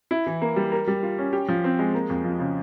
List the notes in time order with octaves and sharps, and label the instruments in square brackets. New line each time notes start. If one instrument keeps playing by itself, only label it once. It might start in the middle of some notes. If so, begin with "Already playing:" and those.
[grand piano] E4
E3
A#3
G3
A#4
G3
F4
C#4
G4
F3
C4
G#3
A#3
F2
F3
C#3